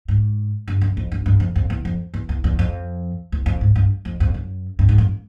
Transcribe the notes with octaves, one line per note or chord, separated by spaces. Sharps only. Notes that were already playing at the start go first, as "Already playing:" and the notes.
G#2
G2
F#2
F2
G2
G2
F2
F2
E2
F2
E2
E2
E2
F2
E2
F2
G#2
G2
F2
F2
F#2
G2
G#2
F#2